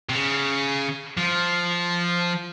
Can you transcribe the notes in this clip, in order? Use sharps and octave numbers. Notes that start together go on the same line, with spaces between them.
C3
C#3
F3